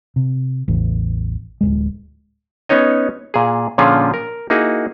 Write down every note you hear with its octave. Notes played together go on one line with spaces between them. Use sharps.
C3
A1 E2
D1 C#2 G#3
B3 C#4 D#4 C#5 D#5
A#2 G#4
A#2 D3 F3 C#4 F4 G#4
A#4
A#3 D#4 E4 F#4 G#4